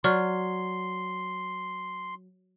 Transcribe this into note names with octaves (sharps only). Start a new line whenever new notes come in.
F#3 D5 C6 C#6 F6